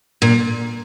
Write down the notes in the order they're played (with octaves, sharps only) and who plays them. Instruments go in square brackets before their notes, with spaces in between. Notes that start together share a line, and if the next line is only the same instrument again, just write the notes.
[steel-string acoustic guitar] A#2